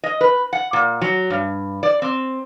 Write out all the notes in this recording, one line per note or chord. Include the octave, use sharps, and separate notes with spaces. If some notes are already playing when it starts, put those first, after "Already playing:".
D#5
B4
F#5
A#2
F#3
G2
D5
C4